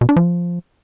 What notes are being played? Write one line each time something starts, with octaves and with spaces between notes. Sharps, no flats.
B2
D4
F3